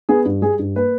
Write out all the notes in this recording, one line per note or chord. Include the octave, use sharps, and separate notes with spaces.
B3 G#4
G2
G3 G#4
G2
A#3 B4